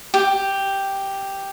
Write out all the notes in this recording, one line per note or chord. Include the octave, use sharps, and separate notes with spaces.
G4